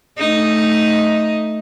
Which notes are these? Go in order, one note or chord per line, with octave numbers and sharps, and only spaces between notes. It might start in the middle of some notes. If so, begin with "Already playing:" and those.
A3 D#4